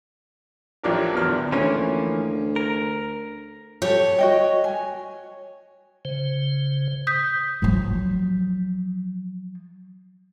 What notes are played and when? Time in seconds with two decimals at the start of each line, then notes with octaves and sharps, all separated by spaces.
0.83 A1 F3 F#3 D4 G4 A#4
1.14 E2 B3 F6
1.26 D2
1.52 D2 E3 F3 A#3 C#4
2.56 A#4
3.82 G4 A4 C#5
4.19 F#4 D#5 G5
4.64 G#5
6.05 C#3 C5
7.07 D#6 G6 B6
7.62 F3 F#3